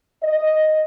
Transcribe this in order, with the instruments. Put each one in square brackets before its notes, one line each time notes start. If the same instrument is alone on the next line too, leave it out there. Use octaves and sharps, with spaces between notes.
[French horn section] D#5